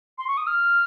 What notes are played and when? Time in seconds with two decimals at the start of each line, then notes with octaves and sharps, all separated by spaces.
0.18 C6
0.28 C#6
0.37 D#6
0.47 F6